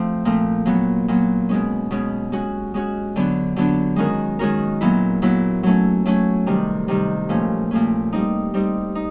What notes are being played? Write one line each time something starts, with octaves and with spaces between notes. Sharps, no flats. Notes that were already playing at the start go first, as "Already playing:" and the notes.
Already playing: F3 A3 C4
A#2 F3 A3 C4
A#2 F#3 B3
A#2 F#3 B3
B2 G#3 C#4
B2 G#3 C#4
G#3 C#4 F#4
G#3 C#4 F#4
D3 F#3 B3 D4
D3 F#3 B3 D4
D#3 G#3 C#4 F#4 A#4
D#3 G#3 C#4 F#4 A#4
A#2 F#3 B3 E4
A#2 F#3 B3 E4
F#3 A3 C#4
F#3 A3 C#4
C3 D#3 G3
C3 D#3 G3
A#2 F3 A3 C#4
A#2 F3 A3 C#4
G3 C4 D#4
G3 C4 D#4
D#4